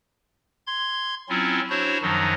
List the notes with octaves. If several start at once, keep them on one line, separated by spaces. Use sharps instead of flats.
C6 G#6
F#3 C4 C#4 E4 F4
D4 E4 F#4 C5 C#5
F#2 D#3 F3 F#3 D#4